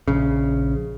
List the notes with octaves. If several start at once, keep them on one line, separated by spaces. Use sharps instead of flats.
A#1 C#3